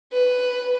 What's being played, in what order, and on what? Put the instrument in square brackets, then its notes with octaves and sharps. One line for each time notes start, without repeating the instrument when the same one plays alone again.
[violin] B4